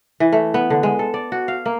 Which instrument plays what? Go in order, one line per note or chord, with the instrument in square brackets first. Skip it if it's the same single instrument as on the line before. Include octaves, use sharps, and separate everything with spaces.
[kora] E3
A3
B3
D3
G#3
A4
D5
F#4
F5
A#3